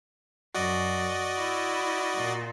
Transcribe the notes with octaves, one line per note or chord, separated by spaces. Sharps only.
F#2 F#4 D5 D#5
E4
A#2